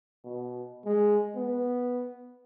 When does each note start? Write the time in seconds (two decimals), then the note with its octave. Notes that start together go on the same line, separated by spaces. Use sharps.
0.24 B2
0.85 G#3
1.36 B3